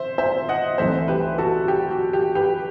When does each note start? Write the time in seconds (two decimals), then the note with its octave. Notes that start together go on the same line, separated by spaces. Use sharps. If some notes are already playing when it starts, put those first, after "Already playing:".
Already playing: C5 E5
0.18 C5 E5
0.49 D#5 F#5
0.78 C2 C3 E3 A3 D#4 C5 E5
1.08 G4 B4
1.38 F#4 A4
1.68 G4
1.91 F#4
2.13 G4
2.35 G4 B4